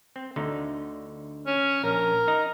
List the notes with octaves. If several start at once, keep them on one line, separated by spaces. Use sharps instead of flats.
C4
D2 D3 D#4
C#4
A#1 A#4
D#4 D#5 A#5